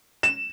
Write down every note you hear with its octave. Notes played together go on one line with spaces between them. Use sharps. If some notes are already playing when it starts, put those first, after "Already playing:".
E7